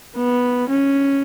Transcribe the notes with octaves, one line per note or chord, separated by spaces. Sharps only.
B3
C#4